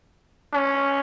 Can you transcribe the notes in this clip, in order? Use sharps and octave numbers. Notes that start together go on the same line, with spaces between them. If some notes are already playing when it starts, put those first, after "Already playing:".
C#4